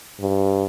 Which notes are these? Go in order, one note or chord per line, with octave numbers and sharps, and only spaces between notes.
G2